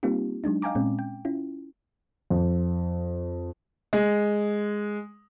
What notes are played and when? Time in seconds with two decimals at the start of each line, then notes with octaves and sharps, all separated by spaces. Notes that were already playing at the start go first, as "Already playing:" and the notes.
0.03 G3 A#3 C4 D#4 F4 G4
0.44 F#3 G#3 D4 D#4
0.62 D#5 F5 G5 G#5 A#5 D6
0.75 A#2 G#3 C4 C#4
0.99 G5
1.25 C#4 E4 F4
2.30 F2
3.93 G#3